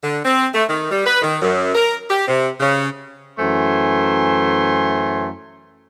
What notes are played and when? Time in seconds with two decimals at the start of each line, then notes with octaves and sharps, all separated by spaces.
0.03 D3
0.25 C4
0.53 A3
0.68 D#3
0.91 G3
1.05 B4
1.22 D#3
1.42 F#2
1.74 A#4
2.09 G4
2.27 C3
2.60 C#3
3.39 F#2 E3 A3 C5 G#5 C6